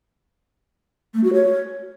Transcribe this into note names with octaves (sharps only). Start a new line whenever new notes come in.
A3
F#4
C#5